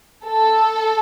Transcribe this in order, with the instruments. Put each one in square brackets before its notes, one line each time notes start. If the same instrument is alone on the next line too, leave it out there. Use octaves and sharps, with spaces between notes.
[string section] A4